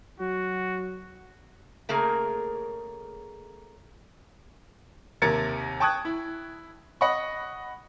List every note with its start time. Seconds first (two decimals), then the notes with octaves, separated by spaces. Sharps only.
0.20 F#3 F#4
1.89 C#3 A3 A#3 G#4 A#4
5.22 D#2 C3 A#4 G#6 A6 C#7
5.80 G5 A5 C#6 D#6 F#6 G#6
6.05 E4
7.01 D#5 F#5 B5 C#6